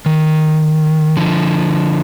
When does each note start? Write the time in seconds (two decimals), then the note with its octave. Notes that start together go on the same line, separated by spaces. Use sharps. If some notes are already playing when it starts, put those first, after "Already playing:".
0.06 D#3
1.17 D3 F3